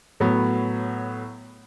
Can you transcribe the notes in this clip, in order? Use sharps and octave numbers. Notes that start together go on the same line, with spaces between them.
A2 F#3 B3